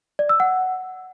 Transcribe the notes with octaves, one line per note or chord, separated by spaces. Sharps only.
D5
E6
F#5